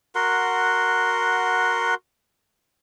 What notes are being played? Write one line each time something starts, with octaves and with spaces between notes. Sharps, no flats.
F#4 A#4 F#5 C6